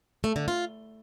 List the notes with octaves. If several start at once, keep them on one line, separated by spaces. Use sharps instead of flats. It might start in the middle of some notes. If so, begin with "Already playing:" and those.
A3
D3
F4